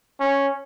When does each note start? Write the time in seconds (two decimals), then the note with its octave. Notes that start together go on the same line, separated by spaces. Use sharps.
0.20 C#4